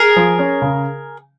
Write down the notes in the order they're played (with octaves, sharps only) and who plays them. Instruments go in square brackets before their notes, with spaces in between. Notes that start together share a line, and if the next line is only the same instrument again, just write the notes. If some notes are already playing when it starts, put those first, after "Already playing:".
Already playing: [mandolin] G#4 A#4
[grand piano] F3
C#4
C#3